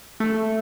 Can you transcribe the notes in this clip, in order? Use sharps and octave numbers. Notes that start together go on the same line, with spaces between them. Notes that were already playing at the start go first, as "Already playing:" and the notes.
A3